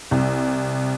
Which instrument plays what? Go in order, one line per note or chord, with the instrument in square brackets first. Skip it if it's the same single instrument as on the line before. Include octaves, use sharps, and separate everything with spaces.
[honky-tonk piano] C2